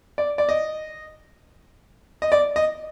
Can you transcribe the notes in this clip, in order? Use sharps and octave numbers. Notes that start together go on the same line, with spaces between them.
D5
D5
D#5
D#5
D5
D#5